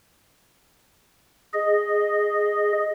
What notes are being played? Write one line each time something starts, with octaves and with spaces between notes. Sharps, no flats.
G#4 D#5